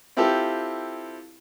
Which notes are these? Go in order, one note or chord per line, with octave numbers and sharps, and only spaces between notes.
C4 E4 F4 G4 A4